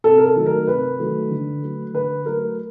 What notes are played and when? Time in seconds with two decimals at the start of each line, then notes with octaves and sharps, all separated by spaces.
0.04 C3 A4
0.18 A#4
0.25 A4
0.36 D#3 F#3 A3
0.46 A#4
0.67 C3 B4
0.99 D#3 F#3 A3
1.31 D3
1.62 F#3 A3
1.94 D3 B4
2.26 F#3 A3 A#4